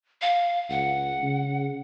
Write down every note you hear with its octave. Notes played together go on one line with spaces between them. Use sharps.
F5
C#2 F#5
C#3